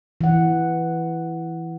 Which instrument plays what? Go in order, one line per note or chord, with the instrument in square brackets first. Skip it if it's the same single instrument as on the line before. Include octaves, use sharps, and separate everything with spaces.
[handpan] E3 F#5